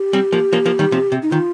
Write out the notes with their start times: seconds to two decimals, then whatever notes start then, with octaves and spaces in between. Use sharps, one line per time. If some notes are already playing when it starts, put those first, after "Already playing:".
Already playing: G4
0.13 G3 C4
0.32 F3 A#3
0.53 F3 A#3
0.66 F3 A#3
0.79 D#3 G3
0.92 C3 F3
1.12 C3
1.22 D#4
1.31 D#3 F4